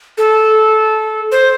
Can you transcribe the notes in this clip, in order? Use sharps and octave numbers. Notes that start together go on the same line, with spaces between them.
A4
C5